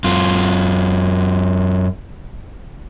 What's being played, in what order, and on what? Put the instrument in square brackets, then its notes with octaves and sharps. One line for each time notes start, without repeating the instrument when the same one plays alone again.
[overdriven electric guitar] F#2 F4